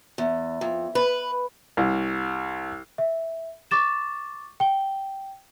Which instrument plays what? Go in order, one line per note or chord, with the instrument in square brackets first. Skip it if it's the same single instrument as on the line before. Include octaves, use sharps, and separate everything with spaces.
[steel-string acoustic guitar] E2
F2
B4
[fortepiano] C2
[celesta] E5
C#6 D6 A6 E7
G5 G7